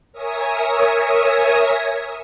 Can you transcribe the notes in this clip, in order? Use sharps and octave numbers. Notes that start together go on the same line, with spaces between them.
A#4 C#5 E5 G#5 D#6